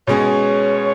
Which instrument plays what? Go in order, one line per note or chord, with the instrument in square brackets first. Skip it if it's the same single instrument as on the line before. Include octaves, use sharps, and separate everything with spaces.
[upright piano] B2 G#3 C#4 [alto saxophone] C#5